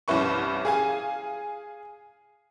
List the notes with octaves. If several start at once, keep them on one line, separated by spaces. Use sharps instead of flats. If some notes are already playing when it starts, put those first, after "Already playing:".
C2 G2 C#4 E4 B4 C#6
G#4 F5 G#5